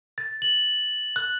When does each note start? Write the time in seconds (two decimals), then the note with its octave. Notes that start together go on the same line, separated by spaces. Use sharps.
0.18 A6
0.42 F#7
1.16 F#6